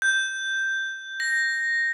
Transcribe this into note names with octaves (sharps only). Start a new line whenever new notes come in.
G6
A#6